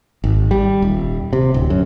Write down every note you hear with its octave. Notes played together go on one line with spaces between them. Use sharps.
G#1
G3
D#1
C3
D1
F#2